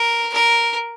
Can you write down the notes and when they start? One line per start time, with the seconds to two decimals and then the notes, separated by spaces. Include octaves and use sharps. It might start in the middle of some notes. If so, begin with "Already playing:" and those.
Already playing: A#4
0.34 A#4